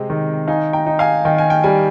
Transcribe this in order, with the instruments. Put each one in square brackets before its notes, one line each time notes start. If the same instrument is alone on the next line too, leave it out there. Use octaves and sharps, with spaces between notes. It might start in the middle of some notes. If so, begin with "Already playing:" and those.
Already playing: [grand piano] C3 G#3 C4 [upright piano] D#5 G5
[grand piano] D#3
[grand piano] D#4 [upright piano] F5 G#5
[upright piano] G5 A#5
[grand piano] D#4
[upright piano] F5 G#5
[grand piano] D#3 [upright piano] G5
[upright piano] G#5
G5
[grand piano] G3 [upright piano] G#5